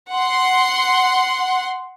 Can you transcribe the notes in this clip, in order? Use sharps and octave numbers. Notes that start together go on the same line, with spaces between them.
F#5 C6